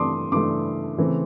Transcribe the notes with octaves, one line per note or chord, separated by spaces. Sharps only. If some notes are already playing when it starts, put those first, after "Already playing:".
Already playing: G2 E3 A3 C6 D6 D#6
G2 E3 A3 C6 D6
C#3 E3 A3 C4